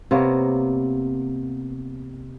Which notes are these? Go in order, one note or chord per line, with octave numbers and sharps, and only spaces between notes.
C3 A#3 B3 C#5